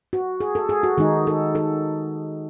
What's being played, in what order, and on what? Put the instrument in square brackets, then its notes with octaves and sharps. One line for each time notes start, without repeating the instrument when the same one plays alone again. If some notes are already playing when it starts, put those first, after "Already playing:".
[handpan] F#4
G#4
A4
G#4
F#4
D#3 G#3 D#4 G#4
A4
A4